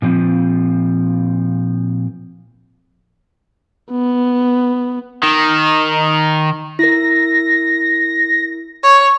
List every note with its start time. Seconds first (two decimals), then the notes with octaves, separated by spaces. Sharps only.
0.02 A#2 F3 C4
3.91 B3
5.23 D#3
6.79 E4 A#4 A#6
8.83 C#5